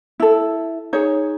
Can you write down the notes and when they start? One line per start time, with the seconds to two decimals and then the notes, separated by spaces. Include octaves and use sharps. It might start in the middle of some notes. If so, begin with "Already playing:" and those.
0.20 E4 A4
0.93 D#4 G#4 C#5